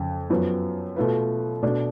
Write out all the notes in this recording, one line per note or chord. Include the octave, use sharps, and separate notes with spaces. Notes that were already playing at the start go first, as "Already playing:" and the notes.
Already playing: F2 C#3
F#2 F3 B3 F#4
B2 A3 F4 B4
B2 A3 D4